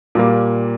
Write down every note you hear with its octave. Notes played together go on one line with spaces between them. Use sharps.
A#2 G3 A#3